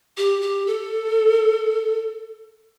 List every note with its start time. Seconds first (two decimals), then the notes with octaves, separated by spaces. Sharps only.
0.17 G4
0.41 G4
0.67 A4